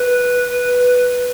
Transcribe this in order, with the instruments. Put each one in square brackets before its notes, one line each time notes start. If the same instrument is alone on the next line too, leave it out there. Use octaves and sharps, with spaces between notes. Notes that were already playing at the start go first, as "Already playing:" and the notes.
Already playing: [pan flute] B4